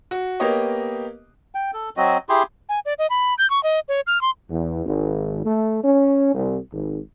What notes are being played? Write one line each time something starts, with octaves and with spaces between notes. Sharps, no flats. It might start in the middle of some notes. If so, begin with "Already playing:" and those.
F#4
A#3 B3 G4 C#5 D#5
G5
A4
F#3 C4 F#4 D#5
E4 G4 G#4 C6
G#5
D5
D#5
B5
G6
C#6
D#5
C#5
F6
C6
E2
G#1
A3
C#4
C2
G#1